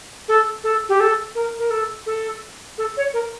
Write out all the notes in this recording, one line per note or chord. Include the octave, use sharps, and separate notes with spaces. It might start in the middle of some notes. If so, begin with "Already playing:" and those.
A4
A4
G4
A4
A#4
A#4
A4
A4
A4
C#5
A#4